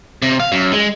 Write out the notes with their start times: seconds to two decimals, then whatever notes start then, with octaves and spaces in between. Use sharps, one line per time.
0.22 C3
0.40 F5
0.52 F#2
0.73 G#3